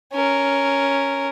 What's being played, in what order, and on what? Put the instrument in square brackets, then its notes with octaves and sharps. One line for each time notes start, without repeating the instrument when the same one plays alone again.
[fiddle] C#4 A#4